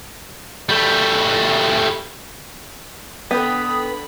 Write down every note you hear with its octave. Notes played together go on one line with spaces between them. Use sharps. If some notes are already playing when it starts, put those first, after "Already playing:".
G3 A3
D3 B3 B4 G5 B5 D#6 B6